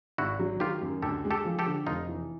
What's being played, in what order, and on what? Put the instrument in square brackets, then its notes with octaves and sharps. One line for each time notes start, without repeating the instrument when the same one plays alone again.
[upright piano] G#1 [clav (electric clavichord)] E4 F#4
[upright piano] F#3
[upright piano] D#3 [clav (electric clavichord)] F4 G4
[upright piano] F#2
[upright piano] D2 [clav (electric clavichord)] G4 A4
[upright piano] G#3
[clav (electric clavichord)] G4 A4
[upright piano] F3
[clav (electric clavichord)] G4 A4
[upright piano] D3
[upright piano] F1 [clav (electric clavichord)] D#4 F4
[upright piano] E3